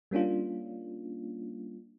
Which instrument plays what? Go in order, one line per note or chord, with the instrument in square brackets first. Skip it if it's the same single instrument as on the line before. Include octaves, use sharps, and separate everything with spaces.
[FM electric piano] G3 A#3 C#4 D4 F4